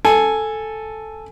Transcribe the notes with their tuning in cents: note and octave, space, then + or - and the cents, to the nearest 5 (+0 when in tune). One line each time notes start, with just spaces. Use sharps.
A4 +0 G#5 +0